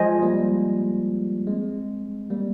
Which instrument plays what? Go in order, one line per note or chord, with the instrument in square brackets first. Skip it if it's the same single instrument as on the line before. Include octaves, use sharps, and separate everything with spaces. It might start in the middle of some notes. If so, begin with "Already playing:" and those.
Already playing: [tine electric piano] F3 G#3 [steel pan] C5 D#5 G#5
[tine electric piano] G3 A#3
G#3 C4
G3 A#3